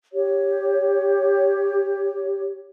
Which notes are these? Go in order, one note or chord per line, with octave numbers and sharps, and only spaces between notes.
G4 C#5